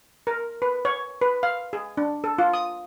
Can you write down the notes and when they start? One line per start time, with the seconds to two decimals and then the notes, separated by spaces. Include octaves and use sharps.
0.27 A#4
0.62 B4
0.85 C#5
1.21 B4
1.43 F5
1.73 G#4
1.97 D4
2.24 A4
2.38 F4
2.54 D#6